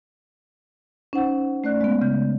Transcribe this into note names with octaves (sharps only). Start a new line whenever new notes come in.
C#4 D#4 C5 F#5
A3 C#4 D5 F#6
G#3 B3
C#3 G6